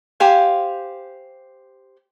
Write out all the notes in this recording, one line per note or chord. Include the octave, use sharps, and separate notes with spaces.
G4 C5 F5 G#5